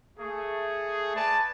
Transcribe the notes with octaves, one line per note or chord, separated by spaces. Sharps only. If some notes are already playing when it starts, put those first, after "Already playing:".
A3 G#4
B4 D5 G#5 A5